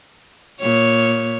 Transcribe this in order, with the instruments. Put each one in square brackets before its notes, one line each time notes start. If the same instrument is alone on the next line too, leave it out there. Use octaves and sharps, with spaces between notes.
[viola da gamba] A#2 C#5